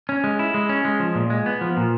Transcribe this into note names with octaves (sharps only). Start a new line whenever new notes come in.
C#4
G#3
E4
G#3
C#4
G#3
F3
A#2
G#3
B3
F3
A#2